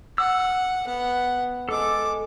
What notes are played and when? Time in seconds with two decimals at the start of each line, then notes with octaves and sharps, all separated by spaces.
0.18 F#5 E6
0.85 B3 F#5
1.69 G#3 A4 D6